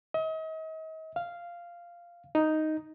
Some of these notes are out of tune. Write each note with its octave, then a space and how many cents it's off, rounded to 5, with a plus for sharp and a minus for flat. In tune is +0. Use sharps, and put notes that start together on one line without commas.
D#5 +40
F5 -5
D#4 +0